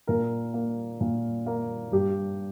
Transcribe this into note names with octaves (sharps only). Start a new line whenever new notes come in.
A#2 A#4
A#3
A#2
A#3
G2 G4